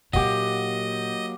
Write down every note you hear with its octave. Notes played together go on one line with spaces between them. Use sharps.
A#2 F#3 A#3 D#4 G4 D#5 F#5